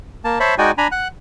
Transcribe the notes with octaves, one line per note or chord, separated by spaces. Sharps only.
A#3 A5
C5 C#5 E5 A5 B5
G#3 D#4 F#4 D5 G5 G#5
D4 G#5 A#5 B5
F#5 F#6